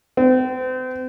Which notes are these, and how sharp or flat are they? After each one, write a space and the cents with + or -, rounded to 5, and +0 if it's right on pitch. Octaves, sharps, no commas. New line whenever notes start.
C4 -40